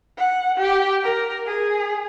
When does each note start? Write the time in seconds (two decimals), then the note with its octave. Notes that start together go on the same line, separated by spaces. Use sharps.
0.18 F#5
0.58 G4
1.03 A#4
1.46 G#4